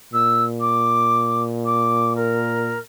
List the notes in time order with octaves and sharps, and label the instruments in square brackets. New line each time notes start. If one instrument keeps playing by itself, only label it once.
[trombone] A#2 [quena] E6
[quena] D6
D6
A#4